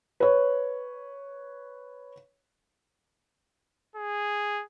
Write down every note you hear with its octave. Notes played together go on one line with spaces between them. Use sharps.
B4 C#5
G#4